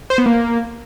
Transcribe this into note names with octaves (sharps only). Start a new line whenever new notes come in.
C5
B3
A#3